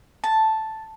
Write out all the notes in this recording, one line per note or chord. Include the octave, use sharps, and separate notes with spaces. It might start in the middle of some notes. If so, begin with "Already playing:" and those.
A5